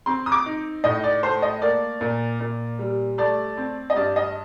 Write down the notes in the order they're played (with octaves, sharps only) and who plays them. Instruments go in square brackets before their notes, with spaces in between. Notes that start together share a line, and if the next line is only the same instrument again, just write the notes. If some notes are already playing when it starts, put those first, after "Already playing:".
[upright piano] C4 C6
D#6
D6
D#4
A2 D#5
D5
A3 C5
D#5
A#3 D5
A#2
A#2
G3
A3 D5
C4
D#5
G2 D5
D#5